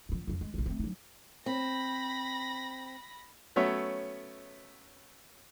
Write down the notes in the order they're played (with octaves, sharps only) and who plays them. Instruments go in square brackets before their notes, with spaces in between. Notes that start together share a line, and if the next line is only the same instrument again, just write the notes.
[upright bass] A2 F3
F2 F3
G#3
A#1 E2
A3 C4
F#3 D#4
[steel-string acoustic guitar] C4 [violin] B5 A#6
[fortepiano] F#3 A3 B3 C#4 C#5 E5